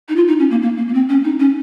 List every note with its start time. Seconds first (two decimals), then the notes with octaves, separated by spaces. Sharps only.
0.09 D#4
0.16 F4
0.28 D#4
0.39 C#4
0.50 A#3
0.62 A#3
0.77 A#3
0.88 A#3
0.94 C4
1.09 C#4
1.24 D#4
1.40 C#4